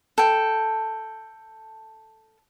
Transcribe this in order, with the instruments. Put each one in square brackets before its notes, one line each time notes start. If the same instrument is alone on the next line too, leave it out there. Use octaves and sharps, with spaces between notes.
[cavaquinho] A4 G5